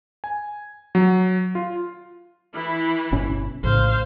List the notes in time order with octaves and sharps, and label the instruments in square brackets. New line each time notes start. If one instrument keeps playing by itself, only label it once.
[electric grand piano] G#5
F#3
F4
[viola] E3 E4
[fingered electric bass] G1 B2 C#4
[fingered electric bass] A#1 A2 C#3 [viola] C5 F5